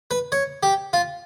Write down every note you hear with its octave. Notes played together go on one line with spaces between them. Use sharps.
B4
C#5
G4
F4